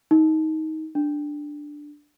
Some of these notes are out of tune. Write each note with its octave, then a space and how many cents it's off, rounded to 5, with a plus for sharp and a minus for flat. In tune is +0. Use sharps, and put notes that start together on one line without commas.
D#4 +20
D4 +5